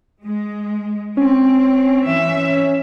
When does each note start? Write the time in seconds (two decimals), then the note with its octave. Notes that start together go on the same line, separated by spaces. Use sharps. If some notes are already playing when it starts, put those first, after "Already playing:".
0.21 G#3
1.17 C4 C#4
2.04 E3 E5